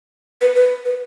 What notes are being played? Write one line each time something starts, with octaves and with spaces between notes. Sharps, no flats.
B4
B4
B4